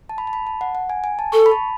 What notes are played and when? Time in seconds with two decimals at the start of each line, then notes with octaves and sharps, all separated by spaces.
0.09 A5
0.18 B5
0.27 A5
0.33 B5
0.47 A5
0.61 F#5
0.75 F#5
0.90 G#5
1.04 G#5
1.19 A5
1.32 A4 C#6
1.46 B5
1.52 A5